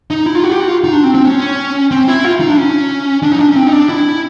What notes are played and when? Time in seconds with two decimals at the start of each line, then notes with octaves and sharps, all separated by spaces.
0.10 D#4
0.26 E4
0.35 F4
0.44 F#4
0.51 G4
0.60 F#4
0.68 F4
0.84 D#4
0.93 D4
1.04 C4
1.15 C4
1.25 C#4
1.91 C4
2.08 E4
2.24 F4
2.40 D#4
2.49 D4
2.57 C#4
3.23 D4
3.32 D#4
3.40 D4
3.48 C#4
3.56 C4
3.67 D#4
3.72 D4
3.89 E4